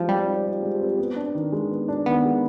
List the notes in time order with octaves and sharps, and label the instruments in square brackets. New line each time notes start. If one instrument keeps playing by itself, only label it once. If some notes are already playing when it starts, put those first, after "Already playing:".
Already playing: [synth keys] F3 [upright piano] G#3 D#4 G4
[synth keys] G3 [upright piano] C4
[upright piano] D#4
G4
G#3
C4
B3
D4
D#3
G#3
B3
D4
[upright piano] D#3 [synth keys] B3
[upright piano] G#3